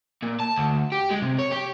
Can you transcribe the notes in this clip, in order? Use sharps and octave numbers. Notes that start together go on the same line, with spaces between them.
A#2
A5
D2
G4
G#3
C3
C#5
G4